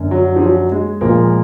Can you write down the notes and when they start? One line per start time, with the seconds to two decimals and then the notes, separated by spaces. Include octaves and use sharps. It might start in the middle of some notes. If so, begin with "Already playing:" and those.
Already playing: F#2 D3 A#3
0.11 F#3
0.36 F3
0.41 F#3
0.72 G#3
1.01 A#2 F3 G#3 A#3